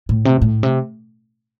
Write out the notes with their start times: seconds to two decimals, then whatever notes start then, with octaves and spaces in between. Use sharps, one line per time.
0.09 A2
0.25 C3
0.42 A2
0.63 C3